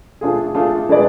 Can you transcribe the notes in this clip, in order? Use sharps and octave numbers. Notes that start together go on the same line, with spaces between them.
A3 D4 F4 G#4
A3 D4 F4 G#4
G#3 D4 G#4 B4 D5